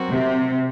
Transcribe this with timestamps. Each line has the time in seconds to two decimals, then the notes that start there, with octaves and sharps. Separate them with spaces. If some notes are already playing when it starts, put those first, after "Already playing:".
Already playing: F#3 C4 F#4 A#4
0.10 C3